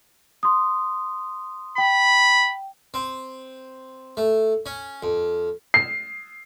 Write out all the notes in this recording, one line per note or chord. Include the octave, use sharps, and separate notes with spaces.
C6 D#6
G5 B5
C4
A3
C#4
F2
C7